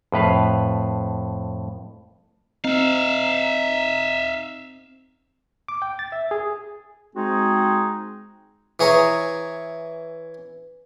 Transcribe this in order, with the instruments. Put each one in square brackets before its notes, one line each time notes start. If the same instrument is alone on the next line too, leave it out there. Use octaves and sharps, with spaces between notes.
[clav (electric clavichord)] F2 A2 B4 F5
[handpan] C4 [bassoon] D#4 [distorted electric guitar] E5 F5
[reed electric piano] D6
G5
A6
E5
G#4
[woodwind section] G#3 C4 D#4 F#4 G#4
[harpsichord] E3 G#4 C#5 A#5